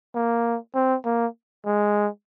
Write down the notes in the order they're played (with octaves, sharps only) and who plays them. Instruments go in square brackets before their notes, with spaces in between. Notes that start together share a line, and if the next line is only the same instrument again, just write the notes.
[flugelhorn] A#3
C4
A#3
G#3